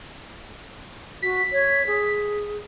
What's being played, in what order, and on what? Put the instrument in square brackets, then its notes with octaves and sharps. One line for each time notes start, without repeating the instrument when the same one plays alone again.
[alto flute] F#4 [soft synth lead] B6
[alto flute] C#5
G#4